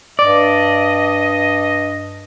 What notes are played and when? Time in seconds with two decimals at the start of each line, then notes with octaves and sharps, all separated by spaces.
0.19 G2 D5 D#5